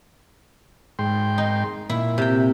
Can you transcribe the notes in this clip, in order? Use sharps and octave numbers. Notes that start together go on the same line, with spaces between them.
G#2 G5 C6
D#4
A#2 E4
C3 G5